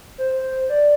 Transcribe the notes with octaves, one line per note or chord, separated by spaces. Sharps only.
C5
D5